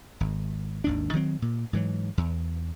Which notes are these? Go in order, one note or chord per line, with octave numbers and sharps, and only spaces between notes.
G#1
G#1 D#2 D4
D#3 F#3 C4
A#2
G#2 E3 F#3
E2